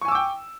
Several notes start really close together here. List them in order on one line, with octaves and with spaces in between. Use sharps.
C#6 G#5 E6 D6 G5